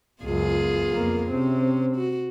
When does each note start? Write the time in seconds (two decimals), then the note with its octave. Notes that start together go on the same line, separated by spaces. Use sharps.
0.22 C#2 F#2 B3 F4 G#4
0.90 F2 A#3
1.30 C3 C4 C#4
1.96 F#4